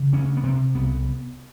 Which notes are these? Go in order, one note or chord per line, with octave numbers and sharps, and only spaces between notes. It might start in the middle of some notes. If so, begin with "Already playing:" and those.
Already playing: C#3
D2 C#4
B3
C3 C4
C2 B3